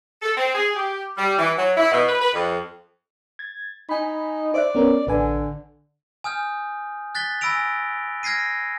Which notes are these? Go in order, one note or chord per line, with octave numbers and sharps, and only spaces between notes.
A4
C4
G#4
G4
G3
E3
F#3
E4
B2
B4
B4
F2
G#6 A6
D#4 G#5 B5
C5 D5 E5 F#6
B3 C#4 A#4
A1 D3 B4 G#5
G#5 D#6 F6 G6
F#6 A6 B6 G7
G#5 B5 E6 A#6 D7 F7
F6 G#6 A#6 C7 D#7